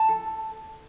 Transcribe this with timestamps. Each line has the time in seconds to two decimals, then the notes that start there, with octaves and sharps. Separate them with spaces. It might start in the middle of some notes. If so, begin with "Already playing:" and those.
Already playing: A5
0.09 A4